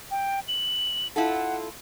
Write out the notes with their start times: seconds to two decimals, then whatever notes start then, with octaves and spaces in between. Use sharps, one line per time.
0.11 G5
0.48 F#7
1.16 E4 F4 A4 F#5